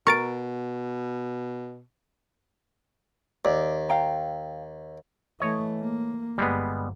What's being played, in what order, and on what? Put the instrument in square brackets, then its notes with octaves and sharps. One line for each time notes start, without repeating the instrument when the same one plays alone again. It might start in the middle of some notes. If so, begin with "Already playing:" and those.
[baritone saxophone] B2 [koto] A#4 [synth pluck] C#6 A6 D7
[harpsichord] D#2 [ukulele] D5
[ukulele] F5 G5 A#5
[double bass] E3 A3 [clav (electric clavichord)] C#5 D#5
[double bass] A#3
[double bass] G1 [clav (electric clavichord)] G3 G#3 B3